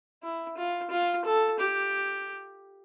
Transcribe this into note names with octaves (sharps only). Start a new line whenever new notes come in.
E4
F4
F4
A4
G4